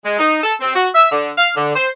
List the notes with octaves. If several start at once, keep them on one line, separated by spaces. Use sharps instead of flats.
G#3
D#4
A4
C4
F#4
E5
D3
F5
D3
C5